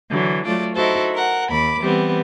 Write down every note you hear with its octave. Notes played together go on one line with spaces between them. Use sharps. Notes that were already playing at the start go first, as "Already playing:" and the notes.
D3 E3 F#3
F#3 A3 F4 D5
D#4 E4 F#4 A4 C5
A#4 F#5
D#2 B5 D6
E3 G3 B3 C4